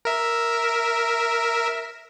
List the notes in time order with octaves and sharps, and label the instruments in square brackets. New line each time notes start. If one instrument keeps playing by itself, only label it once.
[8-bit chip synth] A#4 E5